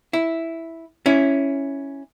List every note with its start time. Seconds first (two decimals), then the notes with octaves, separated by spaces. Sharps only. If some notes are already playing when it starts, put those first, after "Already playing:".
0.13 E4
1.06 C#4 E4